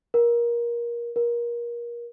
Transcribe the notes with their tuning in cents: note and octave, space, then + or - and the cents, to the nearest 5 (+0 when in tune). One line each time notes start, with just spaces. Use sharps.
A#4 +20
A#4 +25